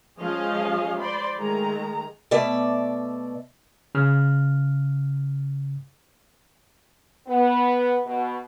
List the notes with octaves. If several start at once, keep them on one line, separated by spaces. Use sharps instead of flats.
F3 G#3 C#4 G#4 D#5 F5
C5 D5 B5 C6
D#3 G#3 A3 A#5
B2 A3 D5 E5
C#3 F6
B3
B2